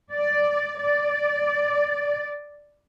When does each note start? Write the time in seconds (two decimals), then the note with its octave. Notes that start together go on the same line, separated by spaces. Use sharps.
0.13 D5
0.81 D5